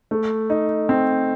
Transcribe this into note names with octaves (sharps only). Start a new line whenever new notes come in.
A3
D#4
C4